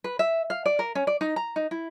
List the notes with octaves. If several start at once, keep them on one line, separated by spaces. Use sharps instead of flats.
B4
E5
F5
D5
A#4
C#4
D5
D#4
A#5
D#4
E4